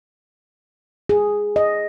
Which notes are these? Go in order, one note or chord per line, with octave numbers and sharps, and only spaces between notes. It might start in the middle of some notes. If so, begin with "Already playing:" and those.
G#4
D#5